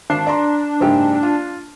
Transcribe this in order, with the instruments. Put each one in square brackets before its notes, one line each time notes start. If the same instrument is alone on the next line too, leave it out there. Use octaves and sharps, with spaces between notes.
[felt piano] G#1 C7 [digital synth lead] D4
[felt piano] D5 A#5 C6
F#1 G#2 G4
F4